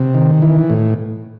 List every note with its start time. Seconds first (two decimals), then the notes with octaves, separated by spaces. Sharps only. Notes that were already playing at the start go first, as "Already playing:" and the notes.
Already playing: C3
0.15 D#3
0.42 E3
0.70 A2